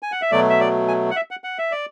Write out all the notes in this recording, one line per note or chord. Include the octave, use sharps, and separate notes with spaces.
G#5
F#5
E5
B2 F#3 A3 D5
E5
D5
G#5
F#5
E5
F#5
F#5
E5
D5